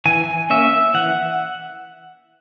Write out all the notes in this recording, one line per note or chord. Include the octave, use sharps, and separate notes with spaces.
E3 G#5
A#3 C#4 E5
E3 F#5